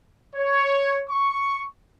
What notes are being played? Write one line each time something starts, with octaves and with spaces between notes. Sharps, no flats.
C#5
C#6